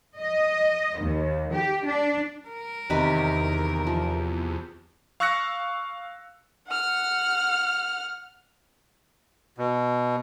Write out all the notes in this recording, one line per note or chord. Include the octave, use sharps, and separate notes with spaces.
D#5
D#2
G4
D4
A#4
E2 C3 D#3 B4
F3
F5 C#6 E6 F#6 A#6 C#7
F#5 F6
B2